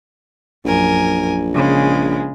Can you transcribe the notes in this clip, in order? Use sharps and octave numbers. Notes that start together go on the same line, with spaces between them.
A#1 F#2 A#4 G#5
C#3 G#3